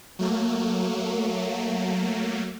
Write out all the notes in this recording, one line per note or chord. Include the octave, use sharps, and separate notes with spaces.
F#3 A3 A#3